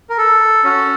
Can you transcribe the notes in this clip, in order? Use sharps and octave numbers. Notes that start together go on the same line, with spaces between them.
A#4
A4
C#4 F#4